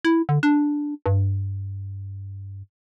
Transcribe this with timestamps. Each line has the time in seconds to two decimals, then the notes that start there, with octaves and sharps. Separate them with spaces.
0.05 E4
0.29 D3
0.43 D4
1.06 G2